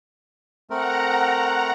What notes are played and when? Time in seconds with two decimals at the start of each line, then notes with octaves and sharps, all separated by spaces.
0.70 A3 C4 A#4 F#5 A#5